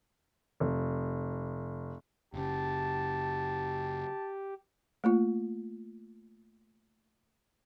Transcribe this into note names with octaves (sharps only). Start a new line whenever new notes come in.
F1
F#1 C#3 G4 A5
A3 A#3 F4